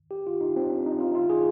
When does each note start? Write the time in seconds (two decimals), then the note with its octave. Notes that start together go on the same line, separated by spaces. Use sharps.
0.11 G4
0.27 F4
0.41 D#4
0.56 C4
0.70 D4
0.86 D#4
1.00 F4
1.12 D#4
1.15 F4
1.30 G#4